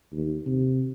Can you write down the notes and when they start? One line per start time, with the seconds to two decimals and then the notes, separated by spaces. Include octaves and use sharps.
0.12 D#2
0.47 C3